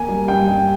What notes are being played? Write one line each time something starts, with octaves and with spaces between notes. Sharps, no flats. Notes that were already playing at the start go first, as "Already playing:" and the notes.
Already playing: A#3 G#5
G3
G2 G5
G2